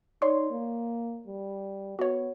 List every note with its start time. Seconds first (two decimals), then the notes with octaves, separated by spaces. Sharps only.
0.22 D#4 C#5 D5 C6
0.50 A#3
1.27 G3
1.99 B3 F#4 C#5